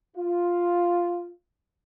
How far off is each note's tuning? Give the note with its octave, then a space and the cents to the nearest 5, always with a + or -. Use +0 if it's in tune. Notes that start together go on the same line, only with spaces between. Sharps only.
F4 +0